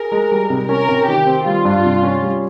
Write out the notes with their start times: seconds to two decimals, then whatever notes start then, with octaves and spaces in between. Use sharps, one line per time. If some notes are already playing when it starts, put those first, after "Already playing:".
Already playing: G#4 A#4
0.12 G#3
0.31 G3
0.50 C3
0.69 C#4 A#4
0.89 C3
1.08 D#3 G4
1.27 C4
1.46 G3 F4
1.65 G2
1.84 C3
2.03 C#4
2.22 G3